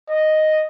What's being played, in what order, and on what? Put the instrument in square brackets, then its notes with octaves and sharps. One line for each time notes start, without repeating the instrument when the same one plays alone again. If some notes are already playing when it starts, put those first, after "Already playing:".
[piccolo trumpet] D#5